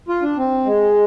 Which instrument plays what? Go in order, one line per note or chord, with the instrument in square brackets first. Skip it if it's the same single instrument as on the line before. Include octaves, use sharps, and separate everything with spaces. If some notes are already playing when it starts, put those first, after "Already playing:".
[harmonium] F4
D4
C4
G#3